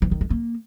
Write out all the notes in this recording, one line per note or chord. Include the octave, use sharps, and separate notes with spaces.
E3
D#3
G#3
A#3